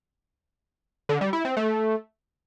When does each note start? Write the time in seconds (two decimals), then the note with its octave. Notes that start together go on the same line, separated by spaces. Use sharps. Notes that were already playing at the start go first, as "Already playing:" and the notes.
1.09 D3
1.21 G3
1.33 E4
1.45 C4
1.57 A3